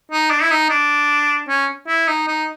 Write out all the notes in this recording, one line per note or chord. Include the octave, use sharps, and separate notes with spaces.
D#4
D4
E4
D#4
D4
C#4
E4
D#4
D#4